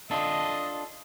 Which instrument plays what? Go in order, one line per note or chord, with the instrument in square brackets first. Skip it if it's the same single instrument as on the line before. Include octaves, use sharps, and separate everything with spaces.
[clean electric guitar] D4 F4 A4 [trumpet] D#5